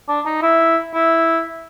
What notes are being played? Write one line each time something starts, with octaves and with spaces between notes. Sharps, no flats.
D4
D#4
E4
E4